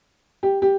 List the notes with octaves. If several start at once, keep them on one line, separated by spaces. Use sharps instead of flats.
G4
G4